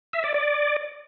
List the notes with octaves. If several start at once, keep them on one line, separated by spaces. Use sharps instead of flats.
E5
D5
D5